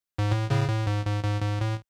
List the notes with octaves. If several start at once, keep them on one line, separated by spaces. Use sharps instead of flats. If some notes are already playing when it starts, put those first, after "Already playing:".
G#2
A2
A2 C#3
A2
G#2
G#2
G#2
G#2
A2